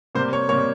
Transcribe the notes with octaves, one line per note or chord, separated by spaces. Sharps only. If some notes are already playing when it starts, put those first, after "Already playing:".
C3 G3 A#3 C5
C#5
C3 G3 A#3 C#5